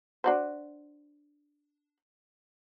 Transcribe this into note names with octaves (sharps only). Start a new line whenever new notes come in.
D4 F#4 C5